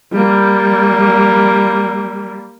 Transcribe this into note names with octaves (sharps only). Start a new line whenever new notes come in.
G3 A#3